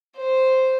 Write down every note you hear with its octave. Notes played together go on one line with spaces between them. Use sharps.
C5